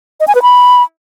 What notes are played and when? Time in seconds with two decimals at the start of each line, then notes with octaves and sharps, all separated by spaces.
0.20 D#5
0.28 G#5
0.35 B4
0.42 B5